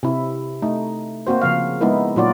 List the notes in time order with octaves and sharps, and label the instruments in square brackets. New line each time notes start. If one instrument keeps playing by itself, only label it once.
[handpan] C3 E4
A3 D#4
A#3 C4 F#4 C5
C#3 F3 F5
G#3 B3 D#4 E4 A#4
A#2 F#3 D#4 F4 F#4 D5